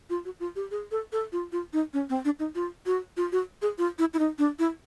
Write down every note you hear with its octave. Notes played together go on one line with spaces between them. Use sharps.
F4
F#4
F4
G4
G#4
A4
A4
F4
F4
D#4
C#4
C4
D4
D#4
F4
F#4
F4
F#4
G#4
F4
E4
E4
D#4
D4
E4